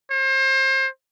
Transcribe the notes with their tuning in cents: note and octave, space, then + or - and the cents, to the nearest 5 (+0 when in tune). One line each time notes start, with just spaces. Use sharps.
C5 +35